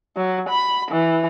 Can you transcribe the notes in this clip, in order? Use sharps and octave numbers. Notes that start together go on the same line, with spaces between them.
F#3
B5
E3